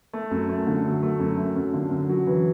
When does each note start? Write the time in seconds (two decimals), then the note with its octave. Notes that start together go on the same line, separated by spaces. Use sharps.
0.13 A3
0.31 F#2
0.49 A3
0.67 D3
0.84 F#3
1.03 A3
1.20 F#2
1.37 A3
1.56 F#2
1.74 D3
1.91 F#2
2.09 F#3
2.27 E3